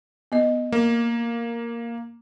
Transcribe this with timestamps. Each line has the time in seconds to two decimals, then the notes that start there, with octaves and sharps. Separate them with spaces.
0.32 B3 D#5
0.72 A#3